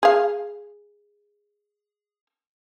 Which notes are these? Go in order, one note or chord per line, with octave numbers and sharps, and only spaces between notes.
G#4 F5